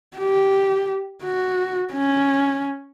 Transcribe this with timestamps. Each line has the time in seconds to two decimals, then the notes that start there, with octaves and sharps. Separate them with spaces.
0.17 G4
1.23 F#4
1.93 C#4